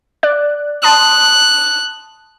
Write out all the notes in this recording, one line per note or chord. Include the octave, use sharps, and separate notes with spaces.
D5 F#6
A5 C6 D#6 F#6